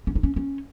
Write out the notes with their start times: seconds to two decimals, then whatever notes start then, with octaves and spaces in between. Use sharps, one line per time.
0.07 C#4
0.15 D#4
0.23 C#4
0.36 C#4